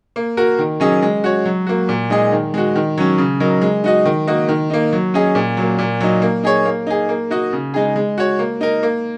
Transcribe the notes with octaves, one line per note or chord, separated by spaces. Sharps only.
A#3
F#4 A#4
D#3
F#3 C#4 G#4 D#5
G#3
F#4 C#5
F#3
A#3 F#4
A#2
G#3 D#4 G#4 D#5
D#3
G#3 F#4
D#3
F#3 C#4
C#3
F#3 D#4 A#4
G#3
D#4 F#4 D#5
D#3
A#3 F#4 D#5
D#3
A#3 D#4
F#3
C#4 G#4 D#5
A#2
F#3 A#3
A#2
F#3 D#4
A#3
D#4 G#4 C#5
A#3
D#4 G#4
A#3
D#4 F#4 D#5
C#3
G#3 D#4 G#4
G#3
F#4 C#5
A#3
D#4 A#4
A#3